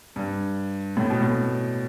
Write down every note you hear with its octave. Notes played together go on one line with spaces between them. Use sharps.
G2
A2
B2
A2